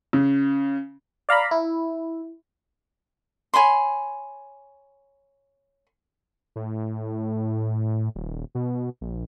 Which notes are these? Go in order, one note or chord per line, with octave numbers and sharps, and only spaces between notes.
C#3
D5 F5 A#5 B5
E4
C#5 G#5 B5 C6
A2
D#1
B2
A#1